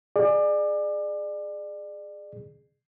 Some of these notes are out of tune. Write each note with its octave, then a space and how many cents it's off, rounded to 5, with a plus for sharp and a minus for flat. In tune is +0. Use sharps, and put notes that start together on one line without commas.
G#4 +0 D5 +30